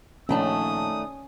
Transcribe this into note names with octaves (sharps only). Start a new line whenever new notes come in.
A#1 D#3 A3 C#4 D4 D#6